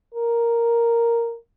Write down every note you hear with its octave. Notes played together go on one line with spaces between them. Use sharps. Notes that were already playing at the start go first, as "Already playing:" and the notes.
A#4